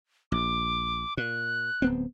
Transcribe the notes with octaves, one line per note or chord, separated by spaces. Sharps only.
A#1 D6
A#2 F#6
D1 B3 C4